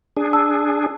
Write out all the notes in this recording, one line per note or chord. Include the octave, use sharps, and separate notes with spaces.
D4 G#4
A5 E6